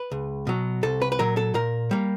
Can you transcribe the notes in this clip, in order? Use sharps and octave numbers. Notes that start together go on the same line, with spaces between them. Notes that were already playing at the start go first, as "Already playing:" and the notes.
Already playing: B4
C#2
B2 F#3
C2 A4
B4
B4
A#2 F#3 A#4
A4
A#2 A#4
G3 A#3